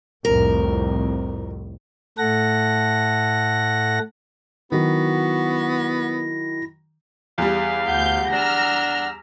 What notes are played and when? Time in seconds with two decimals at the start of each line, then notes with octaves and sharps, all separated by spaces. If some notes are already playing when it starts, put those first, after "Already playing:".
0.25 C2 F2 A2 A#4
2.18 A2 A3 A4 F#5 A#6
4.72 D#3 F#3 B3 E4 F#4 A#6
7.38 E2 G3 F5
7.87 D2 F#5 G6
8.33 D4 A#5 E6 F6